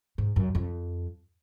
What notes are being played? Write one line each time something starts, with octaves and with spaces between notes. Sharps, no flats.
G#2
F#2
F2